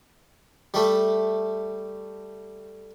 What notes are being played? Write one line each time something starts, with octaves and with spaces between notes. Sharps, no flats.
G3 A3